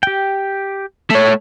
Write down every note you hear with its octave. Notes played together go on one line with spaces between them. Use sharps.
G4 G5
A3 C#5